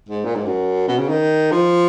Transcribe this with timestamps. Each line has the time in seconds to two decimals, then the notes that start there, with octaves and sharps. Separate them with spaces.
0.09 G#2
0.25 A#2
0.35 G#2
0.46 F#2
0.88 B2
0.99 C#3
1.09 D#3
1.51 F3